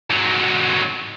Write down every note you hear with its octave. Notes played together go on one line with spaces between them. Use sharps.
G#2 F#3